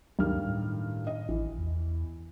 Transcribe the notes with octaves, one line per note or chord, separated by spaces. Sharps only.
D2 G2 D#3 F6
A2
D#5
A1 E3
E2